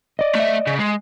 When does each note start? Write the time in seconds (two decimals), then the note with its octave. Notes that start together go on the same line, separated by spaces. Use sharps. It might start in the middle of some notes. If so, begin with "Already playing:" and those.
0.19 D5 D#5
0.35 A3 E5
0.67 C#3
0.79 G#3